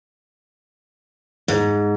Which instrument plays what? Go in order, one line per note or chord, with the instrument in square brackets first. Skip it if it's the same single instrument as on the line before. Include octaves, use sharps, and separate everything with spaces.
[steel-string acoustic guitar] G#2